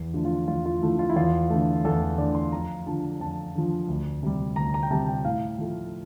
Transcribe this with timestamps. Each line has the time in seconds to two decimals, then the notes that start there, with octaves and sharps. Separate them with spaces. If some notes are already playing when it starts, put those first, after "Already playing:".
Already playing: E2
0.14 D3 F3 A3
0.25 F4
0.48 E2 F4
0.66 F4
0.82 D3 F3 A3 E4
0.99 F4
1.10 E4
1.16 E2 F4
1.50 D3 A3
1.85 E2 A4
2.18 D3 A3 D5
2.35 C6
2.52 F2 A#5
2.86 D3 F3 A5
3.20 F2 A5
3.55 D3 F3
3.88 D2
4.23 C3 G3
4.56 D2 A#5
4.74 A#5
4.83 G5
4.91 C3 G3 A5
5.08 G5
5.25 A2 F5
5.58 F3 A3